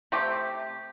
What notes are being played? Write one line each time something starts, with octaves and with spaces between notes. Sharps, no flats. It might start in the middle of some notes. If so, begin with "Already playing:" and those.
C3 A3 C4 G4